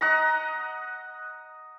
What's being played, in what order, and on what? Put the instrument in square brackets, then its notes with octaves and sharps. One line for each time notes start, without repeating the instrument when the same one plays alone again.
[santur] D#5 F#5 A#5